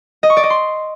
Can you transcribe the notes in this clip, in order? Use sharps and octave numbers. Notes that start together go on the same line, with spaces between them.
D#5
C#6
D5
D#5
C6